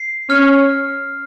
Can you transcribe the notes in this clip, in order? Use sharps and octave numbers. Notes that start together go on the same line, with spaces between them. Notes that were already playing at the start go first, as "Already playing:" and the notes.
Already playing: C7
C#4 F6